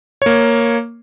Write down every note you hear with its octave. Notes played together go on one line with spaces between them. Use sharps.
A#3 C#5